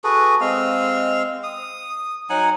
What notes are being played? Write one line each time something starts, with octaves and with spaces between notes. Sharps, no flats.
F#4 G#4 A4 B4
G#3 C4 F5
D#6
F#3 D#4 F#5 G#5